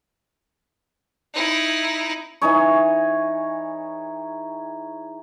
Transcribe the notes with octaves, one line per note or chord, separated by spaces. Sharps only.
D#4 E4
E3 D#4 G#4 C#5